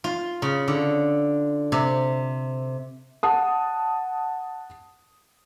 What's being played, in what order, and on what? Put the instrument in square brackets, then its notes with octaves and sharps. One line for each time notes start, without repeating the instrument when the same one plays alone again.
[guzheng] F4
C#3
D3
C3
[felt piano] F#5 A5 D#6